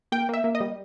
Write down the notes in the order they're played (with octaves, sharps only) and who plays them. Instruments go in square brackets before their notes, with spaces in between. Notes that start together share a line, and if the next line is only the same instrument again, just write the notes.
[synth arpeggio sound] A#3 G5
A#3 E5
A#3
D#5
G3